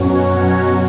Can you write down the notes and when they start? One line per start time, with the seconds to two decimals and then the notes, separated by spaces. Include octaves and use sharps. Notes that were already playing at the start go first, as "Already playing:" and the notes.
Already playing: F#2 B2 F#3 C#4 F#4 C#5
0.32 F#2